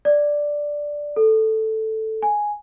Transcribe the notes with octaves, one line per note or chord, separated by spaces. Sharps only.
D5
A4
G#5